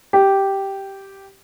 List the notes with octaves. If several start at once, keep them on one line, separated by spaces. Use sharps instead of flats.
G4